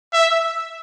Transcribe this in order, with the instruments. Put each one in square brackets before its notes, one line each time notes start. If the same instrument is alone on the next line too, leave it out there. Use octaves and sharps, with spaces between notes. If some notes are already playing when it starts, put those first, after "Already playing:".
[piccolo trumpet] E5